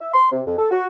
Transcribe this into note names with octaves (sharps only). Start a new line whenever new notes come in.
E5
C6
C3
F2
A4
F#4